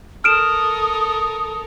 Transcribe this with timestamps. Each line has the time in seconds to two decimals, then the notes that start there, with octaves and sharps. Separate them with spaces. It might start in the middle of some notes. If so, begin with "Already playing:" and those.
0.24 A4 A#4 D#6 F6 D7 E7